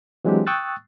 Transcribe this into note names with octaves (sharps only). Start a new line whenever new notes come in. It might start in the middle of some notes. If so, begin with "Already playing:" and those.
E3 F#3 G#3 C4 D4 G4
G5 C#6 D#6 E6 F#6 A6